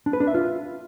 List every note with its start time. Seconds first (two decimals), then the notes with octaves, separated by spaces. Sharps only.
0.06 D4
0.13 B4
0.20 D4
0.27 E5
0.34 F4